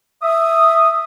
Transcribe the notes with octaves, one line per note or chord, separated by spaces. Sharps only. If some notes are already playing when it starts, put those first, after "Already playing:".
E5 D#6